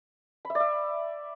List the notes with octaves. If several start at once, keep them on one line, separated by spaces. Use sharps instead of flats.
B5
E5
D5
E5